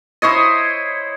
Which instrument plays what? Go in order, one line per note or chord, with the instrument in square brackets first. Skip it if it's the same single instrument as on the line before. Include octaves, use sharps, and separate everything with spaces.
[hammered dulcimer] E4 C5 C#5 D#5